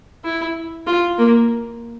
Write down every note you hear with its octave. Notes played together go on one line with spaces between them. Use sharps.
E4
F4
A#3